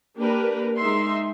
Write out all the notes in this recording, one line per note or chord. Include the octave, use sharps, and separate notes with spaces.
A#3 D4 G4 A#4 B4
G#3 D#4 E5 C6